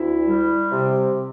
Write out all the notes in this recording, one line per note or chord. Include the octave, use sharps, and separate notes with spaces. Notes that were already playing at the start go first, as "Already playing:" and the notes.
Already playing: D2 E4
G3
C3